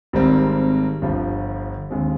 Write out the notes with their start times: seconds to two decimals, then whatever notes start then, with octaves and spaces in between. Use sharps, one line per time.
0.13 G#1 G#2 D#3 G3 C4
1.02 G1 G2 F3
1.90 D#2 D3 G#3 C4